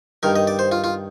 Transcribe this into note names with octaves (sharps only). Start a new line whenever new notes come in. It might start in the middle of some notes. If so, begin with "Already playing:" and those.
G2 D#3 A#4
D#5
D5
C5
F4
F4